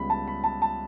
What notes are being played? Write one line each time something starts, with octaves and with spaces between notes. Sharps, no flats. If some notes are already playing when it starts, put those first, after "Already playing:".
Already playing: C#2 C#3 G3 B3 B5
A5
B5
A5
A5